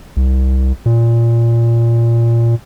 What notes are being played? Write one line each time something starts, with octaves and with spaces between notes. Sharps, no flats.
C2
A#2